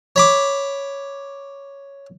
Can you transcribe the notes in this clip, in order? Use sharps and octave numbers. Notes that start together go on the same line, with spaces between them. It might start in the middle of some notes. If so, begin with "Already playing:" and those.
C#5 B5 D6